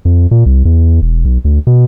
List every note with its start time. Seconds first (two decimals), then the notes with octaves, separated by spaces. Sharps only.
0.05 F2
0.31 A#2
0.46 C2
0.65 E2
1.02 E1
1.25 B1
1.45 D2
1.67 B2